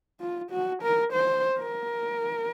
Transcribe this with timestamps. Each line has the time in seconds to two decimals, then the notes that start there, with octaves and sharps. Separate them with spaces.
0.20 F4
0.51 F#4
0.82 A#4
1.12 C5
1.58 A#4